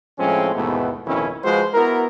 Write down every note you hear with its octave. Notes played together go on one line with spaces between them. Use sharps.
A2 F3 G#3 C4 C#4
D#2 G#2 B2 E3 A3 B3
A1 F2 B2 D#3 C#4 E4
F3 G#3 F4 F#4 B4 C5
B3 E4 F#4 A#4